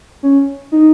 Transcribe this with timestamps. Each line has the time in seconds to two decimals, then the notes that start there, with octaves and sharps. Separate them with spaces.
0.23 C#4
0.72 D#4